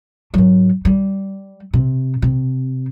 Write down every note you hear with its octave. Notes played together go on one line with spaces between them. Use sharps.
G#2 F#3
G3
C3
C3